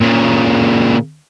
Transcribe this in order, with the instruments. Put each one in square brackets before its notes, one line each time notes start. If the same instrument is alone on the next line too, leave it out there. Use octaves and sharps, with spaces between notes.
[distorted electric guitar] A#2 C#3